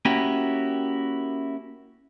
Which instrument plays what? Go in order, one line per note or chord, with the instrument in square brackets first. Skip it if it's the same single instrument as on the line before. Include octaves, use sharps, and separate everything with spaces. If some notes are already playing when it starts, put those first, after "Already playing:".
[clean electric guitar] A#3 C#4 E4 F#4 G4